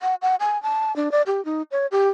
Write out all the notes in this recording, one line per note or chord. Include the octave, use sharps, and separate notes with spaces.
F#5
F#5
G#5
A5
D4
D5
G4
D#4
C#5
G4